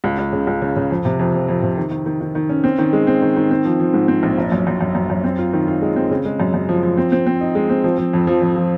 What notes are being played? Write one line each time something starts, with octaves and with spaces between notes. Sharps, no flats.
C#2
C#2
C#3
C#2
C#3
C#3
F2
C3
F2
F2
F2
C3
D#3
D#3
D#3
D#3
D#3
C#4
C4
D#3
G#3
C4
D#3
D#3
C4
F3
F3
G#2
C4
A#1
F#1
F#2
F#2
F#2
F#2
F#2
C4
F4
D#3
F4
G#3
C4
C#3
G#3
F#2
F#2
F3
F3
C4
C4
C4
D#4
G#3
C4
F3
F3
F2
F3
F2
F3